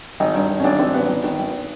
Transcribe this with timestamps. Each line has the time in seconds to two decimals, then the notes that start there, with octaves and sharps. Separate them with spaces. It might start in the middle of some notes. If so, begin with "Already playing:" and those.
0.20 G#1 D#4
0.34 G2
0.50 G#1
0.60 C#4
0.64 G#1 D4
0.79 G#1 C4
0.94 G#1 B3
1.09 G#1 B3
1.24 D#3
1.39 G#1